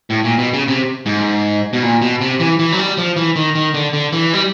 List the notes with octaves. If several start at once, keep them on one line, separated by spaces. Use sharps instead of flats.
A2
A#2
B2
C#3
C3
G#2
B2
A#2
B2
C3
E3
E3
F#3
G3
F3
E3
D#3
D#3
D3
D3
E3
G3